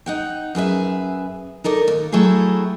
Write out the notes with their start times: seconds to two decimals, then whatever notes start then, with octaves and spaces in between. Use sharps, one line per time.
0.06 D#4 F#5 G5
0.55 F#2 G#4 B4 E5
1.64 D#4 A4 A#4 D5
1.88 D#2
2.12 F#3 A3 E4 G4 G#4